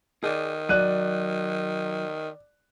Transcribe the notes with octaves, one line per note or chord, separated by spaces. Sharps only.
D#3 G#4 D5
F#3 D5 F#6 D#7